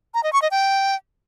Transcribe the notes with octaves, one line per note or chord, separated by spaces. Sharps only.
A#5
D#5
C#6
D#5
G5